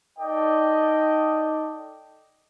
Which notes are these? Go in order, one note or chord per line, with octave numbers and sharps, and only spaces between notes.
D#4 A4 D5 D#5 G5